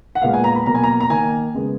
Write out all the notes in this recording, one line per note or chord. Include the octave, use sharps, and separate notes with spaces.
F#5
A#2 G#3 B3 F5
G#5
A#5
B5
B2 F#3 A#3 A#5
G#5
A#5
A#5
D#3 A#3 G#5
C#3 G#3 B3